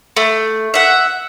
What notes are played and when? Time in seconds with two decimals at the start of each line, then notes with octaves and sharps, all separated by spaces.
0.17 A3
0.74 E5 F#5